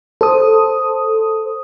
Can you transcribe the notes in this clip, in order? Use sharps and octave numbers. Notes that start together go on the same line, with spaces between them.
A4 C5 D#6